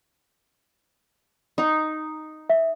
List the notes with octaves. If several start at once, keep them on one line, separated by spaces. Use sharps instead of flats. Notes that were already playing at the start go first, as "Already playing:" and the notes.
D#4
E5